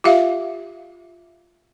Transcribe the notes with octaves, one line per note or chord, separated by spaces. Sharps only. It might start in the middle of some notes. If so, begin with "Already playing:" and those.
F4 G4 E5 F5